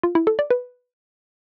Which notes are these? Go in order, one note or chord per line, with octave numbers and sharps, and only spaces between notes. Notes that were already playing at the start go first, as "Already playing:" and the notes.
F4
E4
A4
D5
B4